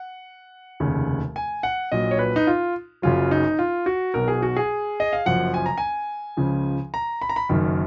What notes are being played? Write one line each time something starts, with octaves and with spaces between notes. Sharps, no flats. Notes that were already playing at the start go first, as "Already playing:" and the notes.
Already playing: F#5
F1 D#2 C#3
G#5
F#5
A#1 A#2 F#3 D#5
C#5
B4
D#4
F4
F#1 F#2 C#3 F#3 F4
D#4
F4
F#4
B1 B2 F#3 A#4
G#4
F#4
G#4
D#5
F5
F#1 F#2 F3 F#5
G#5
A#5
G#5
C#2 C#3 F3
A#5
B5
A#5
B5
F#1 F#2 D#3